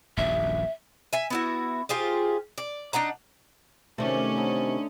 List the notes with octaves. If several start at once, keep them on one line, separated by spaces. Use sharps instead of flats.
D#1 A#1 F#2 E5
E5 G#5
B3 E4 F#4
F4 G4 G#4 C5
D5
D4 D#4 F#5 A#5
C3 D#3 A3 C#4 D5
D3 D#4 A4